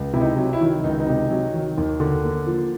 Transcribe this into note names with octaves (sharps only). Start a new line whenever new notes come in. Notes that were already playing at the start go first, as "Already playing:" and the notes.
Already playing: C#2
C3 E4
D#4
F#3
E4
D#3
C#2 D#4
D#4
C3
F#3
D#3
D#2
D3
A#3
F3